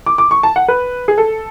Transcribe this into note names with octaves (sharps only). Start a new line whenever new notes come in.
D6
D6
C#6
A5
F#5
B4
G#4
A4